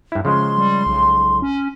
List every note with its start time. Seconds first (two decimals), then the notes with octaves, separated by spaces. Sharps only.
0.12 G2 E4
0.25 C#3 F3 G#3 C6
0.58 G3
0.86 B1
1.42 C#4